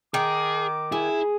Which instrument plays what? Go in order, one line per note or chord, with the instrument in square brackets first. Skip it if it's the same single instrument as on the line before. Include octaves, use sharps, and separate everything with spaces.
[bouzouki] D#3 [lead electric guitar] G#4 [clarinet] D6
[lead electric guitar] E4 [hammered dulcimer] G#4